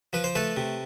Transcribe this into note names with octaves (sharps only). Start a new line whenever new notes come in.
F3 B4
C5
A3 A4 B4
C3